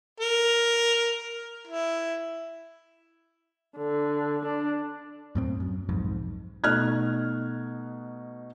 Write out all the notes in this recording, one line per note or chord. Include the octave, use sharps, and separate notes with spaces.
A#4
E4
D3
D4
F#2 A2 C4
F#2
B1 F2 G#2
B2 A3 D#4 F6 F#6 G#6